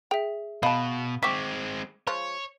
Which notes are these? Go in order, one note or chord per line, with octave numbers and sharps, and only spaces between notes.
G#4 E5 G5
B2 D#5 F5 A5 B5
G#3 C4 E5 G5 C#6 D6 B6
F3 G#3 F4 C#5